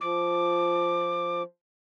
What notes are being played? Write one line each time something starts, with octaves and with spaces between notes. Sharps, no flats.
F3 D6